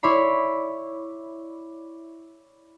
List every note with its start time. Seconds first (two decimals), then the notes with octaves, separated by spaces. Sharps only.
0.03 E4 C#5 D5 B5 C6